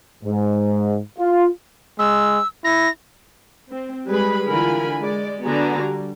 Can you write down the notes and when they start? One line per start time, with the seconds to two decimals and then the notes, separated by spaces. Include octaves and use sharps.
0.24 G#2
1.19 F4
1.99 G#3 E6
2.64 E4 A#6
3.70 C4
4.09 G3 G#3 G#4 B4 B5
4.48 D3 E3 F4 A#4 G#5 B5
5.02 G#3 D5
5.45 D3 B3 F#4 D5 G#5 A#5
5.82 G3